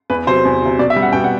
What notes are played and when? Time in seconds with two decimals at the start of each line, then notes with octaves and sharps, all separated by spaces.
0.10 E2 B4
0.27 C3 F#3 C5
0.45 E2
0.62 C3 F#3
0.79 B2 D5
0.90 E5
0.96 G3
1.02 F#5
1.13 B2 G5
1.24 F#5